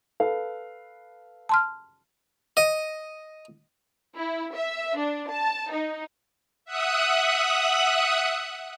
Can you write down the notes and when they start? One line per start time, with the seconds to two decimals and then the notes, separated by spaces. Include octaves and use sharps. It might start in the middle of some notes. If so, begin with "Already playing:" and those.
0.20 A4 B4 F5
1.49 A5 C6 F6
2.57 D#5
4.15 E4
4.54 E5
4.97 D4
5.29 A5
5.71 D#4
6.65 E5 F#5 D#6 F#6